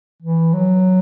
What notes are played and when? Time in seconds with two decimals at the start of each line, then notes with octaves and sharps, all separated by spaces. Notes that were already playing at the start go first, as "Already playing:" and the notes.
0.22 E3
0.53 F#3